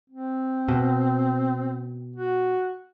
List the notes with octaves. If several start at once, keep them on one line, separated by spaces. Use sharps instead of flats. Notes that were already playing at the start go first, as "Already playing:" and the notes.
C4
B2
F#4